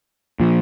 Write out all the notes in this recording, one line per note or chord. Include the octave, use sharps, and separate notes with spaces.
A#2 F3